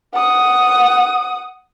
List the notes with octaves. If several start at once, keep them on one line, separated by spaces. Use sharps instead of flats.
F#5 D#6